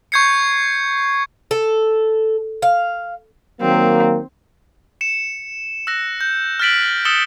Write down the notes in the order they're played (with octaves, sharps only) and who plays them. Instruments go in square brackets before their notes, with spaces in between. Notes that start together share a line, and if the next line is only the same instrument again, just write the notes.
[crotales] C#6 G6 G#6 C7 C#7
[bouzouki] A4
F5
[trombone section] D#3 F#3 A#3 [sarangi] C4
[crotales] C#7 E7
E6 F#6 A#6
G6
F6 F#6 A6 B6 D7 F#7
D#6 E6 A6 C#7 E7 G7